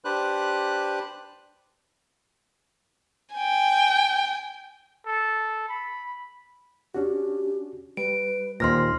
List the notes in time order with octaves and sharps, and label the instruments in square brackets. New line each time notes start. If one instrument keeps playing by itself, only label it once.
[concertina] D4 G4 B4 C5 F#6
[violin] G5 G#5
[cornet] A4
B5
[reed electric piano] C#4 D4 F#4 [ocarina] G4
[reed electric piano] G3 [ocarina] B4 [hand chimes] D7
[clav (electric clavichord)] D#2 A#2 [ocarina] C5 [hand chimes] C6 F6 A#6